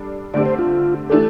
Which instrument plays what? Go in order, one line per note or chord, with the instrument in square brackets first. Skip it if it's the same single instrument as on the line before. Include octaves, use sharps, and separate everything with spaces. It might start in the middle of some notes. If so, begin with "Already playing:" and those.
Already playing: [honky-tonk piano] G3 D4 A4
[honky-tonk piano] D3 A3 C4 G4 [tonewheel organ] D5
[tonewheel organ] C5
F4
[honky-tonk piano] E3 A3 D4 G4 [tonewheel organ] A4